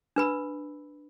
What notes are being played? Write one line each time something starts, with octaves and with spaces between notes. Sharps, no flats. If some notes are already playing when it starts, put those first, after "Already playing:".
D4 B4 B5 E6